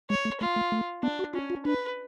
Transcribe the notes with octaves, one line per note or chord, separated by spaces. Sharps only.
G#3 C#5
A3
A3 F4
A3
A3
B3 D4
F#4
C#4 F4
F4
D4 B4